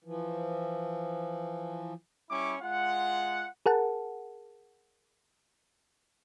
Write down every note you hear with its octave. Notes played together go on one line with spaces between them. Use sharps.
E3 F3
G3 C#4 E4 C#6 D6
G#3 F4 F#5
G#4 A#4 F#5 A5